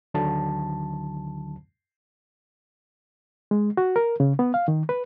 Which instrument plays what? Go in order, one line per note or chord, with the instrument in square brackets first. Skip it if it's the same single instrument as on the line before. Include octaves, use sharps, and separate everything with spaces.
[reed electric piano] D2 D3 D#3 F#3 A5
G#3
F#4
A#4
C#3
B3
F5
D#3
B4